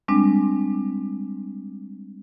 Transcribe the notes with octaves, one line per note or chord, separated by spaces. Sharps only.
G3 G#3 C4 D4